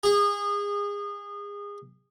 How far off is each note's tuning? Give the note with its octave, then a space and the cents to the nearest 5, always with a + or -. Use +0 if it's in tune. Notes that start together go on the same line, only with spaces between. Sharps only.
G#4 -30